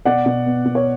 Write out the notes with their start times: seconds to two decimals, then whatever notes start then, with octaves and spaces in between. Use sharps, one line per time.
0.05 B2 D5 F#5
0.26 B2
0.46 B3
0.65 B2
0.75 C#5